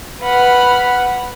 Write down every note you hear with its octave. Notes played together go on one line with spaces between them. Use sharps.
B4 F#5 B5 F6